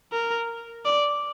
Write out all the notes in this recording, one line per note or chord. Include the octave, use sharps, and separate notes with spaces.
A#4
D5